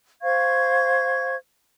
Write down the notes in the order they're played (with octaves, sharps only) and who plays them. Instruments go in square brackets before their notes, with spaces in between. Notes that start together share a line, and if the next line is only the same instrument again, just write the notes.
[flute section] C5 F5 C#6 G#6